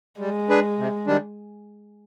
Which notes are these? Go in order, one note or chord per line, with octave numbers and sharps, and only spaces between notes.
G3 G#3
D4 G#4 B4
C3
D#3 G3 D4